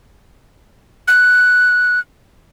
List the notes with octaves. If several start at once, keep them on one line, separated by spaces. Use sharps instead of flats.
F#6